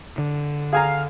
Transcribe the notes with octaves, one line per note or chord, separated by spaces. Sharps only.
D3
G#4 F5 G#5 A#5